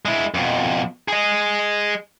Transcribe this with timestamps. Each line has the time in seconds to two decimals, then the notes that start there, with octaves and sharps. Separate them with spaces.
0.05 G#3 E4
0.34 F2 B2
1.08 G#4 D#5